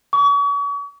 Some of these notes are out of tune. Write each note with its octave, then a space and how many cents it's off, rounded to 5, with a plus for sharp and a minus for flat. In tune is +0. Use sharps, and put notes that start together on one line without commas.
C#6 +40